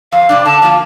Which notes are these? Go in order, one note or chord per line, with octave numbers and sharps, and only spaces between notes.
F2 F5
C3 G3 D4
D3 A5
F3 A#3 F4